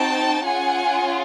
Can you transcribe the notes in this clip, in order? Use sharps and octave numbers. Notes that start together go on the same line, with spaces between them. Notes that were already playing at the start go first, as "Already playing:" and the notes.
Already playing: C4 D#4 F#4 G5 A5
C#4 F4 G#4 F#5 G#5